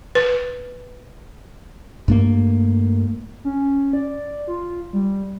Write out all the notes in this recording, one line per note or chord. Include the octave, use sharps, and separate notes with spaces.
B4
G2 A3 A#3
C#4
D5
F4
G3